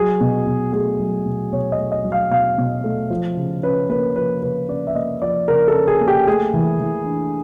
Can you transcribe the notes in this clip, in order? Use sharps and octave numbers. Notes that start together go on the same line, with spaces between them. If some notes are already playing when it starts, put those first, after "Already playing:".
Already playing: F#3 G#4
B2
B2
A3 G#4
F#3
B2
B2 C#5
D#5
A3
D#5
F#3
F5
B2 F5
B2
A3
F3
C#3
C#4 B4
A#3 B4
F3 B4
C#3 B4
C#4 D5
E5
A#3 D#5
F3 D5
C#3 A#4
A4
C#4
G#4
A#3
G4
A3 G#4
E3
E3
D4